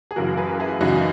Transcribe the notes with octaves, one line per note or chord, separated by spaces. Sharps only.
G#4
F#2 C#3 E3 F#4 A#4
G#4 B4
E4 G#4
F#2 C#3 E3 D#4 F#4